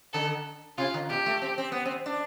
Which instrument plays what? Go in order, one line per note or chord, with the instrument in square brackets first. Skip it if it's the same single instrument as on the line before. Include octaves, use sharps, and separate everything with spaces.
[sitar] D3 [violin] A4
[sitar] C3 [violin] F4
[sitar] D3
[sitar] B2 [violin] G4
[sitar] A3
C4
C4
B3
C4
D4